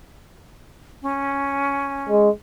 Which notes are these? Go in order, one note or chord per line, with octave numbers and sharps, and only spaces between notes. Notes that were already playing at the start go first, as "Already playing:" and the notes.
C#4
G#3